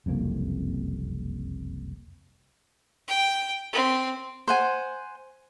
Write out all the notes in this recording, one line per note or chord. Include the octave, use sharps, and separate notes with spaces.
F#1 C2 F2 A#3
G5
C4
C5 F#5 G#5